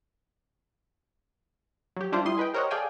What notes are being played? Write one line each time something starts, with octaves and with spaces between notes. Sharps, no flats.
F#3 G4
G3 D4 E4 F4 C5
G3 E4 C6 D#6
E4 G#4 B4 D#5 G5
G4 A#4 C5 C#5 D#5 F#5
G#4 A4 D5 F5 G5 G#5